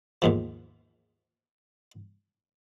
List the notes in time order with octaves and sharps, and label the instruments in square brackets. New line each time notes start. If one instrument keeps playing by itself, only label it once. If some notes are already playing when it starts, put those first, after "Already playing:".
[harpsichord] D#2 G#2 F3